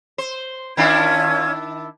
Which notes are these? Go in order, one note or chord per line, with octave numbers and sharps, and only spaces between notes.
C5
D#3 C#4 D4 E4 F4 G#6